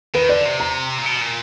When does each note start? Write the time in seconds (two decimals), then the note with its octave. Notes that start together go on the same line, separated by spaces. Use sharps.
0.14 D#3 B4
0.29 D3 D5
0.45 C3
0.60 A#5
0.99 A#2
1.06 B2
1.21 A#2